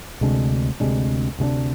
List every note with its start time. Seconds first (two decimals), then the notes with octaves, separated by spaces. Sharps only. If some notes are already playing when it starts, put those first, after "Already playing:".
0.21 D2 C3 G#3 D4
0.80 D2 C3 G#3 D4
1.39 D2 C3 G#3 D4